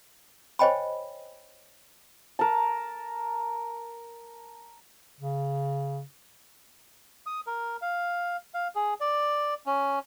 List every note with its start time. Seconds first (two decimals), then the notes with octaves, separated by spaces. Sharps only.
0.59 C5 C#5 D#5 G5 G#5 B5
2.39 A#4 A5
5.21 C#3
7.26 D#6
7.47 A#4
7.82 F5
8.54 F5
8.75 G#4
9.00 D5
9.66 C#4